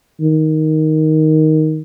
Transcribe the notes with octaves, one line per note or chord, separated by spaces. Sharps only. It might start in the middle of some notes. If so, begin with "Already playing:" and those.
D#3